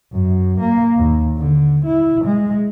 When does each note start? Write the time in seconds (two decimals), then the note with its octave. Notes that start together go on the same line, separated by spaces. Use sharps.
0.13 F#2
0.60 A#3
0.97 D#2
1.37 D3
1.86 E4
2.25 G#3